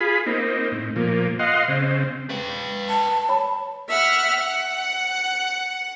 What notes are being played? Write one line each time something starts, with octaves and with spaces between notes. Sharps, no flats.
F4 G#4 B5
A#3 C4 D#4
A2
A#2 F3 A#3
D#5 F5 F#5 C6
C#3 C4
B4 G5
A5
C#5 B5
E5 F#5 F6
F#5